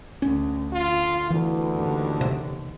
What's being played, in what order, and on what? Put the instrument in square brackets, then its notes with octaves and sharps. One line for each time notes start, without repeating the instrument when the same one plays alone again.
[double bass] D2 [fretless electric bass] C#4
[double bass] D3 [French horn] F4
[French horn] D2 [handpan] E3
[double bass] D#2 D3
[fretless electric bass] C3